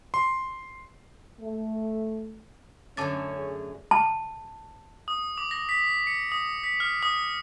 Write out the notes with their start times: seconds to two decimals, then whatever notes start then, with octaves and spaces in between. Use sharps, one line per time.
0.14 C6
1.39 A3
2.97 F#2 D3 A3 C#4 A5 D6 A6
3.37 G#4
3.91 A5
5.08 D#6
5.38 D6
5.51 A#6
5.69 B6
6.07 C#7
6.32 D#6
6.64 B6
6.80 F6
7.03 D#6